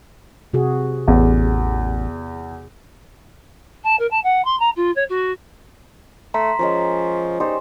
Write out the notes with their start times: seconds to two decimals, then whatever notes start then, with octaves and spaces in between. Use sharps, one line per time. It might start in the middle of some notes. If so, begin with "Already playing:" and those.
0.53 C3 F#4 G#4
1.08 A1 E2
3.83 A5
3.99 A#4
4.10 A5
4.24 F#5
4.44 C6
4.59 A#5
4.76 F4
4.95 C#5
5.09 F#4
6.34 A3 E5 A#5 C6 B6
6.59 F3 G#3 C#4 A#4
7.40 D#4 G4 C5 D5